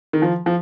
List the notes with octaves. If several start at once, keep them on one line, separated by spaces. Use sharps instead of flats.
D#3
F3
F3